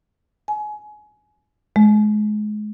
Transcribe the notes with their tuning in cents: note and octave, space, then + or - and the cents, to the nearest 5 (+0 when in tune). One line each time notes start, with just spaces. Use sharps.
G#5 +25
G#3 +30